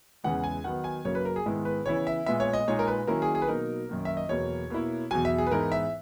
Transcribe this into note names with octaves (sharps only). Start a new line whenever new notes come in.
E2 C#3 E3 G#3 F#5
G#5
D#3 F#3 B3 F#5
G#5
F#2 C#3 F#3 A#3 C#5
B4
A#4
G#4
G#2 D#3 G#3 B3 E4
B4
C#3 E3 B3 E4 C#5
E5
A#2 G#3 B3 E5
C#5
D#5
A#2 G#3 D#4 C#5
A#4
B4
D#3 F#3 A#3 C#4 E4 A#4
G#4
G#4
B4
B2 F#3 A#3 D#4 A#4
F#2 D#3 A#3
E5
D#5
E2 B2 F#3 A#3 C#5
B2 A#3 E4
E2 B2 F#3 G#5
E5
G#4
B4
G#2 E3 B3 D#4 A#4
E5